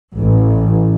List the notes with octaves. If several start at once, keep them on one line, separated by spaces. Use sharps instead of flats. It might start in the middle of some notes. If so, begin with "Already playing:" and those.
A1